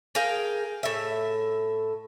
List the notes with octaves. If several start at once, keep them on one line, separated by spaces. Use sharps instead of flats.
G#4 A#4 F5 G5
A2 E5